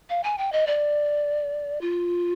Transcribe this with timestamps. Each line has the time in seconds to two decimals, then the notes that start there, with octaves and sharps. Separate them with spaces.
0.09 F5
0.23 G#5
0.38 G5
0.52 D#5
0.67 D5
1.81 F4